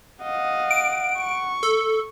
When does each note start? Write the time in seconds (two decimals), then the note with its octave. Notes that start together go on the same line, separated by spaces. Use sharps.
0.23 D#5 F5 F#5
0.71 D7
1.20 C#6
1.63 A4